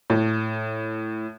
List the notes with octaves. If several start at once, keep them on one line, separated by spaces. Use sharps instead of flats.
A2